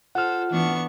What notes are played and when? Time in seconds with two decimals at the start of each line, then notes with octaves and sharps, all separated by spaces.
0.15 F4 A4 C5 F#5 F6
0.51 E3 B3 D4 C#6